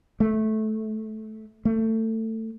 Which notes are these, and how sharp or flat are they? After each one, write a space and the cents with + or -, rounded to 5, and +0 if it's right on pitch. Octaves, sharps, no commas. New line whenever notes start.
A3 -15
A3 +20